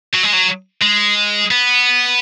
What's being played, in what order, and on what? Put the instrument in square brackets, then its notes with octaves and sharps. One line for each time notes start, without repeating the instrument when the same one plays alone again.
[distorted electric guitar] F#3
G#3
F#3
G#3
B3